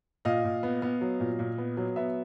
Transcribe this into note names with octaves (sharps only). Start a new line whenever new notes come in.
A#2 D#5 F5
A#2
B3
B3
F#3
A#2
A#2
B3
F#3
B3 E5